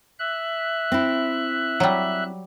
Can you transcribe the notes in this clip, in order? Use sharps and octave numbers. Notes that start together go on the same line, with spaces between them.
E5 F#6
C4 E4
F#3 G3